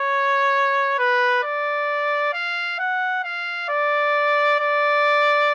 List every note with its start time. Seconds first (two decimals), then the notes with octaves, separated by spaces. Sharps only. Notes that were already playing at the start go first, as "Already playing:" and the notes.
Already playing: C#5
0.99 B4
1.43 D5
2.33 F5
2.79 F#5
3.23 F5
3.69 D5
4.59 D5